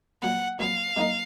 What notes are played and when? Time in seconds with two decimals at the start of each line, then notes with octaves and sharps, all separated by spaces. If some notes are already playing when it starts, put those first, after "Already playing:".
0.22 A#2 F#3 B3 F#5
0.59 A#2 F#3 B3 F5
0.97 B2 F#3 A#3 D#4 A#4